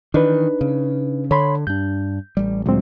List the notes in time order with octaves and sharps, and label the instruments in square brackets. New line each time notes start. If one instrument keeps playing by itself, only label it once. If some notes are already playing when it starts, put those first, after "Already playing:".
[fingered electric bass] D#3 E3 [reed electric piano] D4 D#4 B4
[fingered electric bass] C#3
[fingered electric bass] D3 [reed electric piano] C#5 B5 C6
[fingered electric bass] G2 D4 [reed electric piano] G6
[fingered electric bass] A1 G3
[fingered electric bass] D2 A#2 [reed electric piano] F#3 G#3 C4